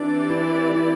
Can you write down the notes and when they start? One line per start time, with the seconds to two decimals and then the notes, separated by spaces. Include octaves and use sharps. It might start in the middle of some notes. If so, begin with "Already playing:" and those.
Already playing: E3 C4 D4 G4 D5
0.30 E4
0.75 E4